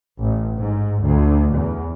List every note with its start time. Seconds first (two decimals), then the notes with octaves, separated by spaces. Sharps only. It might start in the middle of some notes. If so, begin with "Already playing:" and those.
0.22 A1
0.56 G#2
1.04 D2
1.53 E2